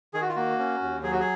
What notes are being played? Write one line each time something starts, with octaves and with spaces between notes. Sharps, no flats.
D#3 G#4
F#4
F4
A#3 F#4
C#4
D#2
F#3 G#4
F#4
G#4